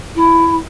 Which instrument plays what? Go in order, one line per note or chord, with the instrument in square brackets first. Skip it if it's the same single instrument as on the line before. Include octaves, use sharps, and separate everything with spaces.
[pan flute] E4